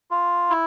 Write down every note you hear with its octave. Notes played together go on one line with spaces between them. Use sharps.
F4
E4